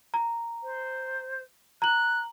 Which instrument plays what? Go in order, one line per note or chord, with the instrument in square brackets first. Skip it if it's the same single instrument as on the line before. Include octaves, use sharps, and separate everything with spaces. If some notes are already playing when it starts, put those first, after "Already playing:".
[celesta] A#5
[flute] C5
[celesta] A#5 F#7 [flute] F#6